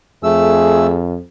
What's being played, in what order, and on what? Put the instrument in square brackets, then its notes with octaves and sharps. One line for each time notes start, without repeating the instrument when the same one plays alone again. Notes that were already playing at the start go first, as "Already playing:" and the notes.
[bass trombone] F2 [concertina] A3 E6 [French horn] G#4